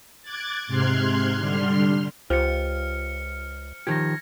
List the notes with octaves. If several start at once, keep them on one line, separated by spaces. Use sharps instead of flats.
D6 F#6 G#6 A6
G#2 C3 C6 F6 F#6 G#6
D3 G3 C6 F6
C#2 F4 G4 C5 F6 C#7
D#3 F3 G4 G#6 A#6